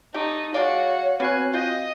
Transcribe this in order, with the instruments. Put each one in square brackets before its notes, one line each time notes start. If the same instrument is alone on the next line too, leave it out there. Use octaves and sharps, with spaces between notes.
[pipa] A3 G4 [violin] D#4
[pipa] G#3 D5 [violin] F#4 C#7 [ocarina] C#5 [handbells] F5
[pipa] B3 [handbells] C4 F#4 F#6 [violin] G#5
[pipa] F4 G5 [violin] D#5